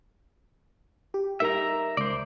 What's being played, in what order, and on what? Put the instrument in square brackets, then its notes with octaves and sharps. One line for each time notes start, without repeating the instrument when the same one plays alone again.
[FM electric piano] G4
[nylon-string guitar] G3 D#4 A#4 [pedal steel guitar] E5 A#5
[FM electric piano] C#2 [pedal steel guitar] C5 D5